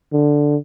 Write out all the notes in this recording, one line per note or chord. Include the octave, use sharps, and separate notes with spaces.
D3